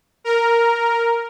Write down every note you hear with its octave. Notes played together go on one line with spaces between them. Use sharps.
A#4